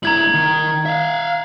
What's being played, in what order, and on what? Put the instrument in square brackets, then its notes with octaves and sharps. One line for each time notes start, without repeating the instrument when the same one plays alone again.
[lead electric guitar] G2 E4 [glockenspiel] A#5 G#6 F#7
[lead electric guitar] D#3
E5 F5